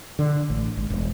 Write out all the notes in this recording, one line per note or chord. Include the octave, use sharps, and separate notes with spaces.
D3
A1
G#1
E1